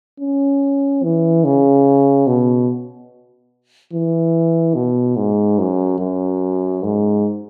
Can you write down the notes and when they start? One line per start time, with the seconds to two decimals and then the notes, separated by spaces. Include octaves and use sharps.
0.20 C#4
1.03 E3
1.44 C#3
2.27 B2
3.93 E3
4.75 B2
5.17 G#2
5.59 F#2
5.99 F#2
6.83 G#2